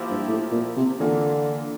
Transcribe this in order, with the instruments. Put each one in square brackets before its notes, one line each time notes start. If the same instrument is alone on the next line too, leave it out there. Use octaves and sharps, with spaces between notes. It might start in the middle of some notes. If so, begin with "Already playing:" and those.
Already playing: [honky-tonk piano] F3 A#3 E4 G4
[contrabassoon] G2
A2
A#2
C3
[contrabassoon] D3 [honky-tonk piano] E3 A#3 F4